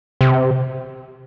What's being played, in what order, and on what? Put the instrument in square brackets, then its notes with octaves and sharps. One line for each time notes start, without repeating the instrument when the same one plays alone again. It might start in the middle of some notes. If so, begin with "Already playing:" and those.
[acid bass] C3